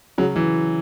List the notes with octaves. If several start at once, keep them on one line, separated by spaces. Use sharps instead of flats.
C#3 F#3
E3